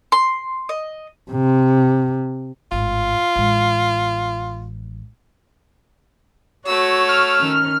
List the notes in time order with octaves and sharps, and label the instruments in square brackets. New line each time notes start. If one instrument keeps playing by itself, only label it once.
[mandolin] C6
D#5
[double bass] C3
[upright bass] G#1 A2 [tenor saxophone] F4
[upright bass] A1 G#3
[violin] A3 E6 [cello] F#4 [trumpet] C#5
[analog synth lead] F6
[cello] D#3 C#4